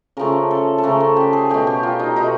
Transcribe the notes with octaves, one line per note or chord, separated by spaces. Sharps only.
C#3 F3 A3 A#4
A4
A4
C#3 F3 A3 A#4
A4
G4
G#4
B2 F#3 A3 G4
G4
F4
D#4
B2 F#3 A3 D#4